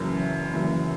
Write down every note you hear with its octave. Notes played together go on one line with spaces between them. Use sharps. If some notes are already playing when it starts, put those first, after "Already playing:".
Already playing: F#1 F#2 E3
F#1 F#2 E3